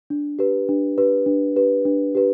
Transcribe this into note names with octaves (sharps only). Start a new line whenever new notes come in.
D4
G4 B4
D4
G4 B4
D4
G4 B4
D4
G4 B4